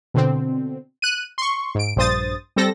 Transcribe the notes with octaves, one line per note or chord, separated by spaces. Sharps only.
B2 D3 C4
F#6 D#7
C6 C#6
G#2 D7
A#1 G2 C5 D#6 A6
G3 C4 A4 A#6